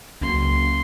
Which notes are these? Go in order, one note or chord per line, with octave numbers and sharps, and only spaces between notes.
F#1 C#2 C6